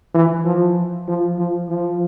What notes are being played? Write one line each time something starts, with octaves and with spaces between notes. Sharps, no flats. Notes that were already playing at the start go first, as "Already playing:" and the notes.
E3
F3
F3
F3
F3